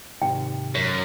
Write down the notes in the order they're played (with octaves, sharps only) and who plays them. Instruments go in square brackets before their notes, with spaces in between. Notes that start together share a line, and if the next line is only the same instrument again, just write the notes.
[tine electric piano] G#2 C3 D#3 [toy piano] G5
[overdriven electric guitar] F#2